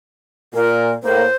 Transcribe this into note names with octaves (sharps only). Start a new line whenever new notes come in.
A#2 A#4
A2 A#3 C5